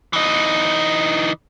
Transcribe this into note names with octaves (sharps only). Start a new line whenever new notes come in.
E3 D#4